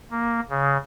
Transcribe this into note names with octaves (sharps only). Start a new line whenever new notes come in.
A#3
C#3